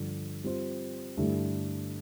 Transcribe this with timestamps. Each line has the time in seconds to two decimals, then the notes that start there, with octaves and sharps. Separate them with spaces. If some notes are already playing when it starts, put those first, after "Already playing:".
Already playing: G2 D3 F3
0.44 G3 C4 F4 C5
1.17 G2 D3 A3 E4 G4